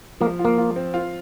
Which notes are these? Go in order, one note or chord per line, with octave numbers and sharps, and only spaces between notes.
F3 A#3
F4
A#3
F4
C4
F4